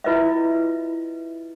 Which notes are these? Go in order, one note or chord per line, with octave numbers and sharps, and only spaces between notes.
E4 F4 B4 D#5 E5